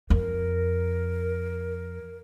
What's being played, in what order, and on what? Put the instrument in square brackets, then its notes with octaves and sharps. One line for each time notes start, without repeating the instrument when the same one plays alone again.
[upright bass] F2 [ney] A#4